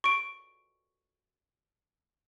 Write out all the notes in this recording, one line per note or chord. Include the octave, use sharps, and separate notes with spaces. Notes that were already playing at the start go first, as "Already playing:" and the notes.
C#6 D7